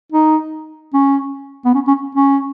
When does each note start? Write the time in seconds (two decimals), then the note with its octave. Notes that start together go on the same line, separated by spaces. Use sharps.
0.12 D#4
0.94 C#4
1.65 B3
1.75 C#4
1.88 C#4
2.15 C#4